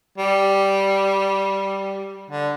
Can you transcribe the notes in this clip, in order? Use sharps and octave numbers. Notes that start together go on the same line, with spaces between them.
G3
D3